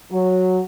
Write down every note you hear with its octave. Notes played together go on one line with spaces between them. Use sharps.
F#3